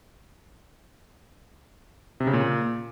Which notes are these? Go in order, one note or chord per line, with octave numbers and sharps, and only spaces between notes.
C3
C#3
A#2